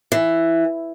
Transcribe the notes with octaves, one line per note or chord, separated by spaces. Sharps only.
E3